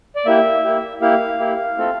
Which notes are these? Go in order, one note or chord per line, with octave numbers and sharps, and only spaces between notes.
D5
A#3 E4 G4 E5
A#3 E4 G4
A#3 E4 G4 F5
A#3 E4 G4
A3 C4 F4 A4